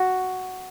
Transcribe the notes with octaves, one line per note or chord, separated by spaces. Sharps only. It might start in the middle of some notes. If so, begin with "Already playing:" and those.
Already playing: F#4